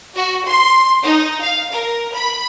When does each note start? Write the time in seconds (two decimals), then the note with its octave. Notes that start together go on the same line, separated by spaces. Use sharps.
0.15 F#4
0.46 C6
1.03 D#4
1.41 F5
1.71 A#4
2.14 B5